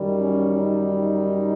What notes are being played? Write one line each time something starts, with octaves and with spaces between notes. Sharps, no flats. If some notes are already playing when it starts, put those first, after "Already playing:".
Already playing: F#2 D#3 G3
C#4
D#4